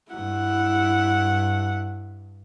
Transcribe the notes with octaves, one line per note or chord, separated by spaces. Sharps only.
G2 E4 F#5